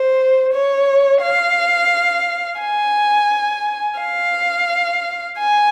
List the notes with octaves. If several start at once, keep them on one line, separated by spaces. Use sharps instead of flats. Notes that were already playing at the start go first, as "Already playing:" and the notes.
Already playing: C5
C#5
F5
G#5
F5
G#5